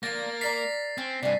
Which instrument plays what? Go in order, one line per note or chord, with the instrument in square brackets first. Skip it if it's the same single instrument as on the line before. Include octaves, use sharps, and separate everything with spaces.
[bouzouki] D3 F3 [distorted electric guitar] A#3 [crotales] A6 A#6
[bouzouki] A#4 D5 A#5 [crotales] A6 B6 C7
[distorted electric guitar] C4 [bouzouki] C#4
[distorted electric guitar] G2 C3 [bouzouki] A3 G#5 [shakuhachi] D5